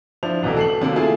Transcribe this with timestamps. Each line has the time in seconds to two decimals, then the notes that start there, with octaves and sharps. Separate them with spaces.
0.23 F3 D4 E4 C5 F7
0.43 E1 C2 B2 E3 A3
0.57 A4 C7 F#7
0.81 D#2 C3 F#3 A3 A#3
0.96 A3 E4 F4 G#4